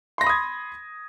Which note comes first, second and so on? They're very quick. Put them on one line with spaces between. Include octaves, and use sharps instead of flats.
C6 A#6 B5 D#6 G#6